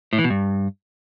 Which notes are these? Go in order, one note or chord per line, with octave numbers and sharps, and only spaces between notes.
A2
E3
B2
G2